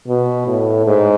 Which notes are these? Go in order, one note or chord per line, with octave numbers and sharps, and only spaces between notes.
B2
A2
G#2